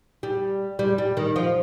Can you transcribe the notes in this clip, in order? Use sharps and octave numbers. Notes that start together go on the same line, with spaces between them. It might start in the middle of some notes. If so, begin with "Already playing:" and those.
G3
G3
G3
D#3
F3